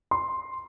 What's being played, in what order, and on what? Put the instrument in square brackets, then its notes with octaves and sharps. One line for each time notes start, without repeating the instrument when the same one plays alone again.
[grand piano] C6